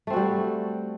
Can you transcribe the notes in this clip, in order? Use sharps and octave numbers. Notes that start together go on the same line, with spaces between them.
G3 A3 C4 F#4